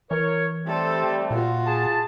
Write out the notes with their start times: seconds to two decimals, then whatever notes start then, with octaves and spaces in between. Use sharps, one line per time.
0.11 E3 A#4 C#5
0.67 G3 A3 C4 A4 C5
1.31 A#2 F4 F#4
1.66 G#4 A5